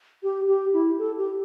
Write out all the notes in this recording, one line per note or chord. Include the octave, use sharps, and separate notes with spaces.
G4
G4
E4
A4
G4